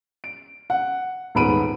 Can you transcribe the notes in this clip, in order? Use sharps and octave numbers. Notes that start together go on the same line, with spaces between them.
D7
F#5
D#1 G#2 B3 B5 D7 D#7